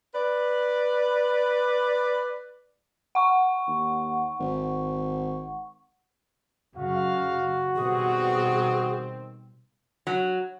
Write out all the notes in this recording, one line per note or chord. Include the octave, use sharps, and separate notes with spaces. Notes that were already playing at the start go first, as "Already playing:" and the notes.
B4 D5
F#5 C#6
D#2
G#1
F#2 C#3 F#4 F5
B2 D#3 G3 C4 G#4
F#3